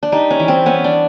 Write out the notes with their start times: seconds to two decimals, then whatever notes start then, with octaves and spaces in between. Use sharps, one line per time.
0.03 D4
0.12 G3 D#4
0.31 C#4
0.39 E3
0.48 C4
0.66 B3 C#4
0.84 D4